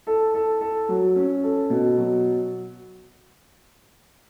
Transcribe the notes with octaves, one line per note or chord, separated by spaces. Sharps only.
A4
A4
A4
F#3
C#4
A4
B2
F#3